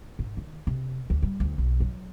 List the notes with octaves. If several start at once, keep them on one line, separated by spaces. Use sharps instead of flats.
G#2
D#3
C3
D2
G3
D2
B1
F#3